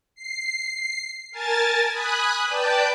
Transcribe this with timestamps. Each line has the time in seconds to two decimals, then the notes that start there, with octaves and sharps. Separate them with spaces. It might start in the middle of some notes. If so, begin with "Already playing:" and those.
0.15 C7
1.32 A#4 G#5 A5 A6
1.92 G#5 B5 D#6 F#6
2.47 B4 D5 G5 A5 G6